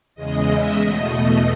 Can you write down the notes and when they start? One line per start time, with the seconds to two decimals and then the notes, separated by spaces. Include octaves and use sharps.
0.15 E2 C#3 G#3 D#5
0.47 E5
0.79 E2 B2 A3 D#5